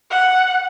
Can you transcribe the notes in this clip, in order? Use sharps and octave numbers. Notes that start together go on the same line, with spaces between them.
F#5